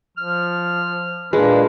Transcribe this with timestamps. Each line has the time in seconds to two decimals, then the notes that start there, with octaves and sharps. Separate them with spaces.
0.17 F3 F6
1.33 A#2 G#3 A#3 D4 B4